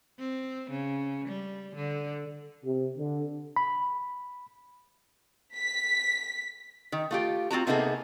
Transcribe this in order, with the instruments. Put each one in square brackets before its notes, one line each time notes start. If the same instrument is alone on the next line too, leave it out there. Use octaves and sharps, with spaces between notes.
[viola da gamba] C4
C#3
G3
D3
[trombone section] C3
D3
[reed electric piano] B5
[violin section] B6
[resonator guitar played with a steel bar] D#3
A3 F4 G4
C4 F4 F#4 A#5
C3 A#3 B3 D#4 G#4 A4